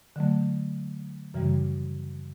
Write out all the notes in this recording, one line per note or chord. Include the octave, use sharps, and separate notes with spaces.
D3 F#3 A3
F#2 C#3 E3 G3